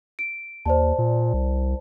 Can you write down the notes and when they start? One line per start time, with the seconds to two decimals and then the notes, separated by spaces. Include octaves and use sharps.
0.19 D7
0.66 D#2 C5 D5 A5
0.98 A#2
1.33 C2